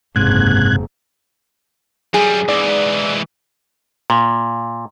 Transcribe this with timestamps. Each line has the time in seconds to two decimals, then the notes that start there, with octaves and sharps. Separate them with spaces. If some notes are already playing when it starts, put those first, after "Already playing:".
0.16 F#1 D#2 G#2 C3 F#6 G#6
2.14 F#2 G3 G#4
2.49 G#2 E3 D5
4.10 A#2